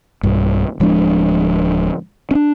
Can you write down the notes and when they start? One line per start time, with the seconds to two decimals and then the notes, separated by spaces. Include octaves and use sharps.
0.23 B1 G2
0.80 D1 F3 G#3 D4
2.31 C#4 D4